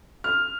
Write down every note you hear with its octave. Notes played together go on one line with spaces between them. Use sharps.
F6